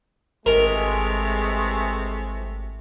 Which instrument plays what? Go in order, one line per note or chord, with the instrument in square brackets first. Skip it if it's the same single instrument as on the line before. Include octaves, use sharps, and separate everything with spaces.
[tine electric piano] G#1 [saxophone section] C3 E3 A3 [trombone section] G#3 [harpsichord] A#4